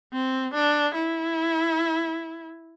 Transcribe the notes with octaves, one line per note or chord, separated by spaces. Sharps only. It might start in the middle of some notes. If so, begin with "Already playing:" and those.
C4
D4
E4